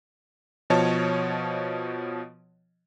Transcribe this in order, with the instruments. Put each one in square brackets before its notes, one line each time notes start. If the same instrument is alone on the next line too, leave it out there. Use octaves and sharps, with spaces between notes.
[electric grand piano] B2 F3 C#5 D#5 A5